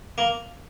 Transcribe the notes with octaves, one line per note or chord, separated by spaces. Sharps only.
A#3